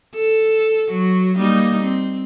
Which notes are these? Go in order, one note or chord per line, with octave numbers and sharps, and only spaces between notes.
A4
F#3 F#4
G3 A#3 D#4
C4